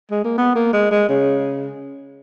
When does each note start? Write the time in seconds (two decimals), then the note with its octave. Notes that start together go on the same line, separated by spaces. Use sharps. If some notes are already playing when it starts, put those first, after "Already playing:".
0.11 G#3
0.24 A#3
0.38 B3
0.55 A#3
0.73 G#3
0.91 G#3
1.09 C#3